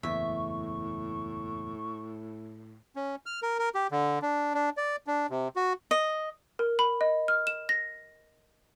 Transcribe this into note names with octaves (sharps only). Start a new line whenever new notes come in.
F#1 E2 A2 E5 C#6
C#4
F6
A#4
A#4
G4
D3
D4
D4
D5
D4
C3
F#4
D#5
A#4
B5
D#5
F6
E7
A#6